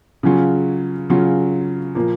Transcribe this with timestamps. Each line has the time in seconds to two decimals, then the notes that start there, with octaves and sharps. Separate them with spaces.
0.23 C#3 F#3 C#4 F4
1.10 C#3 F#3 C#4 F4
1.95 A#2 F3 A#3